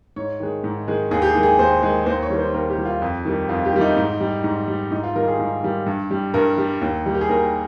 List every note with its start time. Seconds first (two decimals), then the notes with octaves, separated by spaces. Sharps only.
0.16 G#2 C#5
0.40 D#3 G#3
0.64 G#2
0.88 D#3 G#3
1.11 D#2 G#4
1.22 G4
1.27 G#4
1.35 D#3 G#3
1.43 G#4
1.59 D#2 C5
1.83 D#3 G#3
2.06 D#2 C5
2.22 C#5
2.30 D#3 G3
2.38 C5
2.54 D#2 A#4
2.70 G4
2.78 D#3 G3
2.86 F4
3.02 F2
3.25 D#3 G3
3.49 F2 F4
3.65 G4
3.73 D#3 G3
3.81 D#4
3.97 G#2
4.21 G3
4.44 G#2
4.68 G3
4.91 G#2 D#4
5.04 F4
5.15 D#3 G3 A#4
5.28 G#4
5.39 G#2
5.63 D#3 G3
5.86 G2
6.11 G3
6.34 G2 A#4
6.58 G3
6.81 D#2
7.06 D#3 G3
7.14 G4
7.21 G#4
7.29 D#2 A#4